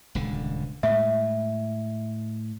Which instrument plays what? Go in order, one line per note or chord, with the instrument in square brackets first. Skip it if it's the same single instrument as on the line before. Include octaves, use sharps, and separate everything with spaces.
[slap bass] D#1 C#2 D3
[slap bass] A2 G#3 [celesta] E5